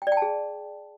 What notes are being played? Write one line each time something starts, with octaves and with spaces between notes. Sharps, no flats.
G5
D5
G5
A5
G#4